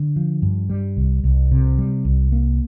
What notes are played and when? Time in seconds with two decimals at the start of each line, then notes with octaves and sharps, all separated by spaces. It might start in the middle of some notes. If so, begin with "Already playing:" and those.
Already playing: D3
0.16 F3
0.42 G2
0.70 G3
0.97 C2
1.24 C2
1.51 C3
1.78 G3
2.05 C2
2.32 A#3